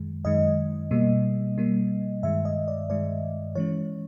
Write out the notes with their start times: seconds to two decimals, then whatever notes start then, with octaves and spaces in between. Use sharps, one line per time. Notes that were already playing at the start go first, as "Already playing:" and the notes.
Already playing: F#2 D#3 G#3
0.25 F#2 D#3 G#3 D#5
0.91 B2 G3 A#3
1.58 B2 G3 A#3
2.23 G2 D#3 G#3 E5
2.45 D#5
2.68 D5
2.90 G2 D#3 G#3 D5
3.55 E3 G#3 C#4 C#5